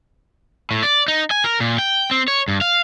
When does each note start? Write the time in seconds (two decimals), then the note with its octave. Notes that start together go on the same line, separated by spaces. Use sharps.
0.71 A2
0.83 D5
1.08 D#4
1.31 G#5
1.44 A#4
1.60 A#2
1.79 G5
2.11 C4
2.28 C#5
2.48 G2
2.61 F5